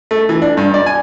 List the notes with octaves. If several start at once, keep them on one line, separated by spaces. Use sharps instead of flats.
A3
E3
D4
G2
D5
G#5